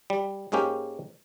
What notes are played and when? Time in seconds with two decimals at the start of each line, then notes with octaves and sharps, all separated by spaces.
0.10 G3
0.52 G#2 G#3 A#3 C#4 G4